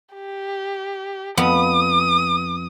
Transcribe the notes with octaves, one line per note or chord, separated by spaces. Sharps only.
G4
F2 B3 B5 D#6